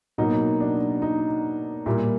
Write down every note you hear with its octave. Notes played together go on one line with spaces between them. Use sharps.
B2 F#3 A#3 D#4
D4
D#4
A#2 G3 A#3 E4